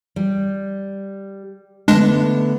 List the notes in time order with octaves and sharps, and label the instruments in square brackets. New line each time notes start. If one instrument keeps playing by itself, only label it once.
[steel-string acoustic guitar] G3
[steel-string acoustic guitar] D3 A3 B3 [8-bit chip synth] G#3 D4